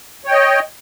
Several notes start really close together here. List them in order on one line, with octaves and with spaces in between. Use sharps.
C#5 G5 D#5